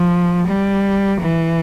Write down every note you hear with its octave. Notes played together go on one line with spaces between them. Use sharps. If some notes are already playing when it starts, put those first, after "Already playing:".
Already playing: F3
G3
E3